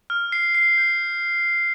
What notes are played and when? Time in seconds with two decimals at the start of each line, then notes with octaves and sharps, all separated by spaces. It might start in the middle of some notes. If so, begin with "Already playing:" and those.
0.10 F6
0.32 C7
0.55 C7
0.78 G6